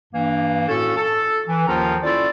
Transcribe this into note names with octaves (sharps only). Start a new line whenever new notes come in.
G2 E3 A#3
A2 C#4 F#4 A4
A4
E3
D#2 D#3 F3 C#4 F4 A#5
C#4 E4 F4 A4 D5